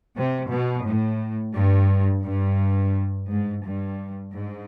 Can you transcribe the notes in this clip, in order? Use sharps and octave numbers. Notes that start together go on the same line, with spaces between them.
C3
B2
A2
G2
G2
G#2
G2
G#2